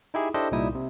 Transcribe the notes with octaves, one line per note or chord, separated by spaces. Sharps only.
D#4 E4 G4 G#4
D4 E4 G4 A4 C5 D#5
C2 A#2 G3 D#4 E4 D#6
C3